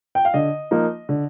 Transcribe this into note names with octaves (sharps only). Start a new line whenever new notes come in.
G5
F5
D3 D#5
F3 A#3 D#4
D3